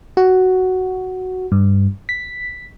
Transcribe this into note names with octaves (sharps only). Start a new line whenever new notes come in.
F#4
G2
B6